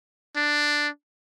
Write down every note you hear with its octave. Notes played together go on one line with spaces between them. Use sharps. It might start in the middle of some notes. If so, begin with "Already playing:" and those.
D4